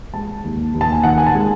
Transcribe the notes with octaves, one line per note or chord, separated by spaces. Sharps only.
G#3 A5
D#2
D#2
A5
G#5
D#3 F#5
G#5
A5
G#3